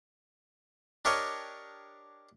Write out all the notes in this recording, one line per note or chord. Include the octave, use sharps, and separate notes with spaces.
D4 G4 A#4 C#5 D#5